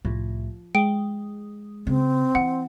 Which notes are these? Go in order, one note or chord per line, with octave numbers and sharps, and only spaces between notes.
C2 A2 F3
G#3 G5 D7
C#3 C4
E3 F#5